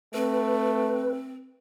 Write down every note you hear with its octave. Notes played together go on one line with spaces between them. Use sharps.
A3 C4 B4